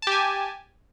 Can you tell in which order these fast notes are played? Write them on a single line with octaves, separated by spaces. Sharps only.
A5 G4 G#5